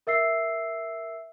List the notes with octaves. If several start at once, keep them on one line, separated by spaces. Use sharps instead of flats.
A#4 E5 E6 C7